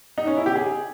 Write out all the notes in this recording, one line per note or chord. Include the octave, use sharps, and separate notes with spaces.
D#4
C#4
E4
G4
G#4